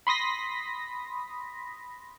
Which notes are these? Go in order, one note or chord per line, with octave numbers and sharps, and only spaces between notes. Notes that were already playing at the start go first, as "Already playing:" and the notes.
B5 C6 D#6 A#6 B6